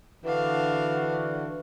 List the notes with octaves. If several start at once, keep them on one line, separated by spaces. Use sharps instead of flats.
D3 E3 D4 F#4 F5